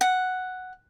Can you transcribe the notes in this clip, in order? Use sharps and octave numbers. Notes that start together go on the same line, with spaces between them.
F#5